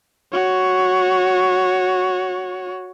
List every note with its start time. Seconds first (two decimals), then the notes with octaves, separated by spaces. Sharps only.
0.33 F#4 C#5